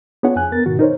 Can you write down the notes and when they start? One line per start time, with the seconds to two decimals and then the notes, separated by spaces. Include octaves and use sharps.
0.23 B3 D4 F4 G#4 C#5 F#5
0.36 F2 G#5 F#6
0.52 B3 A#4 A6
0.66 G#2 B2 D#3 F#4
0.79 D#4 A#4 C5 C#5